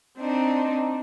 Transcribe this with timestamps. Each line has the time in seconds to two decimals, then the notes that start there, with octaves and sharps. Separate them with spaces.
0.18 C4 D4 D#4